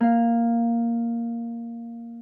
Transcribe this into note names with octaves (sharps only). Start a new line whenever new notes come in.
A#3 F5